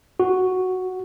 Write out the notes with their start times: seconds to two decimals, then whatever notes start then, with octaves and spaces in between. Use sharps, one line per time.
0.20 F#4